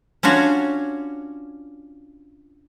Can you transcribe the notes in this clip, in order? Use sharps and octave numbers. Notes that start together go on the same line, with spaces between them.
C#4 D4 F4 F#4 C#5